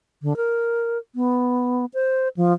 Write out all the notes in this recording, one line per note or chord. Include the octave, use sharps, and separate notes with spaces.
D3
A#4
B3
C5
F3